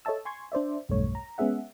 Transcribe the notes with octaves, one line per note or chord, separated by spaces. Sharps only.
A4 C#5 D#5 E5 A5 E6
G#5 C6 C#6 G#6
D4 C5 D5 E5
B1 E2 G2 A3 C#5
A#5
G#3 B3 C#4 G#4 E5 F#5